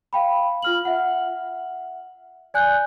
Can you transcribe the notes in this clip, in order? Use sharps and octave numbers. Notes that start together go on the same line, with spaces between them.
F5 G5 B5
F4 F6 F#7
E5 F#5
D5 G#5 F#6 G6